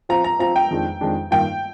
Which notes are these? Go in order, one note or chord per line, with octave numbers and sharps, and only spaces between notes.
F3 C4 F4 A#5
A#5
F3 C4 F4 A#5
G5
F2 D#3 G#3 D4
F2 D#3 G#3 D4
G2 D#3 A#3 F4 G5